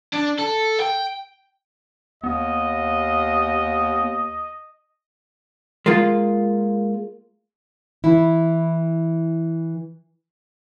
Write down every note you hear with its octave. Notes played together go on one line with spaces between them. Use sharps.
D4
A4
G5
D#2 B3 D#5
G#3 A#3 F4
E3 E4